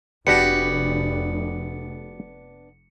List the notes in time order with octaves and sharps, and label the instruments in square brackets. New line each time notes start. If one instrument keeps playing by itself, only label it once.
[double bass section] F1 [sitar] B3 D4 [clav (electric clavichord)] F#4 G4 F#5 [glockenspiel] C#7